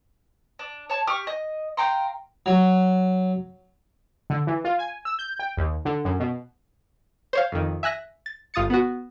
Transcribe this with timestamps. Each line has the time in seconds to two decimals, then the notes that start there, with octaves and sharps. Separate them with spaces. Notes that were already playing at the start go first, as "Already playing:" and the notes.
0.59 D4
0.90 C#5 A5
1.07 G4 C#6 F6
1.27 D#5
1.77 F5 G5 A#5 C6
2.46 F#3
4.30 D3
4.47 E3
4.64 F4
4.79 G#5
5.05 E6
5.19 G6
5.39 G5
5.57 D#2
5.85 D3
6.05 F#2
6.20 B2
7.33 C5 C#5 F5
7.52 F2 D#3
7.83 E5 G#5 F#6 A#6
8.26 A6
8.54 G1 F4 D#6 A6 C#7
8.70 B3 F#4